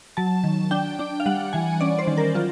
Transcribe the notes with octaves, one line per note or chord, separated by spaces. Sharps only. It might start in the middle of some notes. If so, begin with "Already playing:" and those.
F#3 A5
D#3
D4 G5
D4
F5
G3 F#5
E3 G#5
C#4 D5
C5
D#3
A#4
F#3 F4